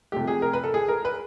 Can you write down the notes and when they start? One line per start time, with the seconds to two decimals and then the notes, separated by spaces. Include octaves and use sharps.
0.12 C3 F3 A3 G4
0.27 G#4
0.42 A#4
0.53 B4
0.64 A4
0.74 G#4
0.88 A#4
1.05 B4